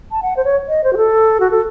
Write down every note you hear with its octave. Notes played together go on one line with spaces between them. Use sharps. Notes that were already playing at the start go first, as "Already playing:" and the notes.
A5
F#5
C5
C#5
D#5
C5
F#4
A4
F#4
A4